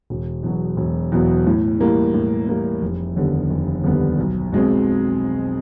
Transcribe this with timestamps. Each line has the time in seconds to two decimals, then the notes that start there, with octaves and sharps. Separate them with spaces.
0.10 E1
0.43 E2 B2 F#3 B3
0.77 E1
1.12 E2 B2 F#3 B3
1.47 A2
1.79 E3 G3 A#3
2.14 A2
2.48 E3 G3 A#3
2.82 F1
3.16 D#2 D3 G3 B3
3.50 F1
3.84 D#2 D3 G3 B3
4.19 B1
4.52 B2 G#3 C4